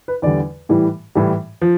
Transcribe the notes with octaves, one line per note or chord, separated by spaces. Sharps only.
B4
E2 D3 G3 D5
A2 E3 G3
A2 E3 G3
F3